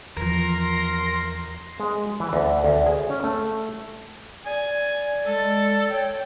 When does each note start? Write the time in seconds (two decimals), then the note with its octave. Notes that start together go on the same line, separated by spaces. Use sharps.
0.17 E2 F3 A#4 C6 A#6
1.80 G#3
2.20 E3
2.33 D2
2.64 D2
2.86 G#4
3.10 C#4
3.24 A3
4.46 D5 G#5
5.26 G#3 A4
5.89 C#5 G5